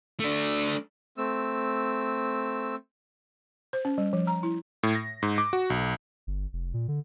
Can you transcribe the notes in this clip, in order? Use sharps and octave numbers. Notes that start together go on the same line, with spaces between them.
A3 D4
A3 C4 E6
C5
C#4
G3
F3
A#5
E4
A2
A#6
G#2
D6
F#4
B1
G1
F1
A#2
D3